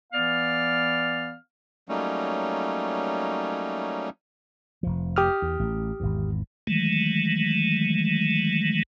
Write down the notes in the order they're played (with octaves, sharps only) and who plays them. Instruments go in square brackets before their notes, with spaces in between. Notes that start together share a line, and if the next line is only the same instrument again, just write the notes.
[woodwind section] E3 B3 D5 F5 F6
[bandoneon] F#3 G3 A3 A#3 C#4 D#4
[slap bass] F1 F3
[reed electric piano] G4 D#6 F6
[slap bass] E2
A1
G#1 E2
[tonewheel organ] D#3 E3 F#3 G#3 A3